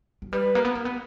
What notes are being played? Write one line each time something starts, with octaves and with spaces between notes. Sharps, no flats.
F#3
G3 B4
A#3
B3
A#3
B3